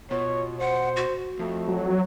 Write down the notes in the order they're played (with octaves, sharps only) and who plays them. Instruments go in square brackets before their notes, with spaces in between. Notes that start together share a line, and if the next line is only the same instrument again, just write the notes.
[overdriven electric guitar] B2 [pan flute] F4 [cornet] C#5
[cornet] C5 [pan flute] F#5
[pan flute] F#4
[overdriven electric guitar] F2 [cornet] A3
[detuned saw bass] F#3